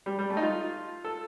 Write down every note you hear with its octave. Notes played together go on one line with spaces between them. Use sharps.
G3
G3
A3
D#4
F4
A4